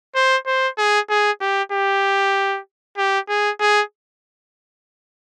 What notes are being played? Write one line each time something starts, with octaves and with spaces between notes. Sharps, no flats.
C5
C5
G#4
G#4
G4
G4
G4
G#4
G#4